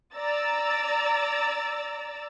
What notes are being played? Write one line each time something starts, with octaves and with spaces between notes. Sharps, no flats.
D5 A#5 E6 A6